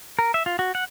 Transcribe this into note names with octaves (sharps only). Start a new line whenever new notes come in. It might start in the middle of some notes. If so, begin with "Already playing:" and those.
A#4
E5
F4
F#4
F#5